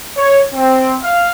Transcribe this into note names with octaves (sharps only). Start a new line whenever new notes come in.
C#5
C4
F5